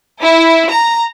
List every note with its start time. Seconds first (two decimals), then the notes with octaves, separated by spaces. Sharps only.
0.22 E4
0.72 A#5